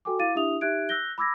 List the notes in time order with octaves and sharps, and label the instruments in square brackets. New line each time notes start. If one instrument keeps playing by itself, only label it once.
[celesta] F#4 A4 G5 G#5 D6
E4 F5 D6 A6 D#7
D4 E4 G4 E5 D#6 F7
D#4 G4 E5 F#6 G#6 D7
E6 F#6 G6 A#6 G7
B5 D6 E6 G#6 A#6